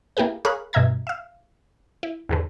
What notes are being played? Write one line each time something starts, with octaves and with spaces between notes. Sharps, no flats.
A#3 E4 G4 G#4 B4
G#4 A#4 C#5 F5 B5 F#6
G2 B2 D#5 E5 A#5 G#6
E5 F5
E4
E2 G#2 D3